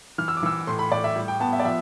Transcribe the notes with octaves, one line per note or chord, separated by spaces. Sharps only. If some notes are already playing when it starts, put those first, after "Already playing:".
E3 F6
E6
D6
E3 E6
A2 C6
B5
A2 D5
E5
G3
G5
B3 A5
E5
D5
F3 E5